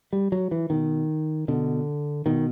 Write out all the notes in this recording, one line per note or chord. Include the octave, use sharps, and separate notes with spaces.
G3
F#3
E3
B2 D#3
B2 D3
B2 D#3